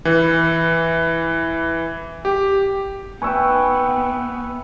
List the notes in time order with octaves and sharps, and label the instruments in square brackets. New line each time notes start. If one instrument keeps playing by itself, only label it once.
[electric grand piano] E3
G4
[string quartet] B3 [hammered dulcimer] B4 E5 G5 [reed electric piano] G#5 C#6